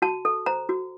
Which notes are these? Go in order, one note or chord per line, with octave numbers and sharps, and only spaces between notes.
F#4 A5
A4
C5 A#5
F#4